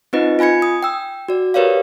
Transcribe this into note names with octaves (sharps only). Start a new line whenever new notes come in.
C4 D#4 F4 B4 D#5
F4 G#5 B5 G#6 C#7
D#6
G5 E6
F#4 D5
G4 A#4 B4 C#5 D5 F5